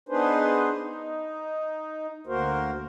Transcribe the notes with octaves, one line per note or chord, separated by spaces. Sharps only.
B3 D4 D#4 G#4 B4 C5
D#4
D2 A#3 F#4 A#4 C5